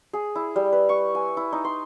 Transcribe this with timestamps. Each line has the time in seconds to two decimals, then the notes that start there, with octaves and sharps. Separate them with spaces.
0.13 G#4
0.36 E4
0.56 G3
0.72 B4
0.89 C#6
1.15 G#5
1.37 E4
1.52 D#4
1.65 C6